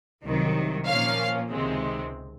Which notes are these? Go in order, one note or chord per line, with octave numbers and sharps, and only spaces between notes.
C2 C3 D#3 F#3
A#2 F3 A#3 C#4 F5
C#2 C3 D#3 G#3 C4